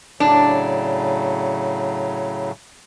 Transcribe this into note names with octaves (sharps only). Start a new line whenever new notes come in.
A2 C#3 F#3 D4